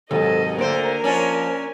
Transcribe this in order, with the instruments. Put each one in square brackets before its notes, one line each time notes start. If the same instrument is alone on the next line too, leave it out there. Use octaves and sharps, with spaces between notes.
[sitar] D#2 [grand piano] G#2 C3 F#3 [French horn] A4 [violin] D#5
[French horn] D2 [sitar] D3 C5 [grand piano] A#3 A6 D7 [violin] A#4 G#5
[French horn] F3 [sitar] C#4 D4